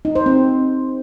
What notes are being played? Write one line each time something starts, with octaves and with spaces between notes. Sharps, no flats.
D#4
C5
C4